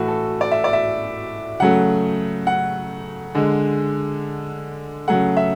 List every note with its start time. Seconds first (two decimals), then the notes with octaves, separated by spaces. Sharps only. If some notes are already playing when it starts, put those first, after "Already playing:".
Already playing: A2 E3 A3 F#4
0.08 A4
0.41 D5
0.52 E5
0.64 D5
0.73 E5
1.60 C#3 F#3 A3 F#5
2.47 F#5
3.35 D3 G#3
5.08 C#3 F#3 A3 F#5
5.37 E5